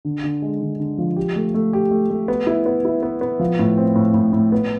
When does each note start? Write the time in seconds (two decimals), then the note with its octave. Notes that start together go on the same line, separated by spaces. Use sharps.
0.05 D3
0.24 D3
0.42 G#3
0.61 D3
0.80 D3
0.98 F3
1.16 G4
1.36 A3
1.54 A3
1.73 G4
1.91 A3
2.10 A3
2.28 B3
2.47 E4
2.66 B3
2.85 E4
3.03 B3
3.21 B3
3.40 F3
3.59 A2
3.77 C4
3.95 A2
4.14 A2
4.33 A2
4.52 B3